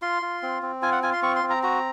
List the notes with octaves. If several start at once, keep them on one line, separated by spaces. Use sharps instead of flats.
F4 C6
F4
C4
C4
F4 G#5
F#5
F4 G#5
C6
C4 C#6
C6
C4
A#5
F#4 A#5